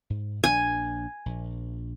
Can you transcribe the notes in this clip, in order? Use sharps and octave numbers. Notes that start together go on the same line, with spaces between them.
G#2
A#1 D4 G#5
A#1